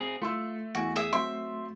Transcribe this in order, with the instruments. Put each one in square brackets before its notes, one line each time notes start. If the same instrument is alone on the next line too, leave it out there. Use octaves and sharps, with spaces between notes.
[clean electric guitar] C4 G#4
[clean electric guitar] A3 [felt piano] F4 C6 E6
[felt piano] E2 G#5 [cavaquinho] F#4
[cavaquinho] G#4 E5 D#6
[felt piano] F#3 C4 C6 [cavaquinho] E5